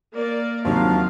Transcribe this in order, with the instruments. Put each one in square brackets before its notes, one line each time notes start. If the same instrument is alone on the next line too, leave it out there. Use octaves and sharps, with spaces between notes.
[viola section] A#3 A#4 D5
[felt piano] D#2 C3 F#3 [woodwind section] F3 D4 [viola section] F5